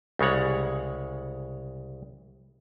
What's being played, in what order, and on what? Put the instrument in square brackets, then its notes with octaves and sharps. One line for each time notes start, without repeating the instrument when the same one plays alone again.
[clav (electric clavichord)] C2 C#3 G#3 C#5 F#5